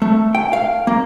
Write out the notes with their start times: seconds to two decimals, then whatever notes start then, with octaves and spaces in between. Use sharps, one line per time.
0.02 A3
0.35 G5
0.53 F5
0.87 A#3